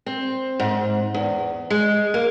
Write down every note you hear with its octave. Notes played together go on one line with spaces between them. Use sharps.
C4
G#2
E2
G#3
A#3